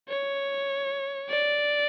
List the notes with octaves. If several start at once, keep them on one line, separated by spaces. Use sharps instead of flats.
C#5
D5